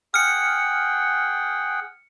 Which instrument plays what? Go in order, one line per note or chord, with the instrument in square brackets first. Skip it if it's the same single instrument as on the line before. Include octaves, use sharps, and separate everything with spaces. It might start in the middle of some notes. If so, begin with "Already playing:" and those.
[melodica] G#4 F#5 G5 [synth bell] F6 C#7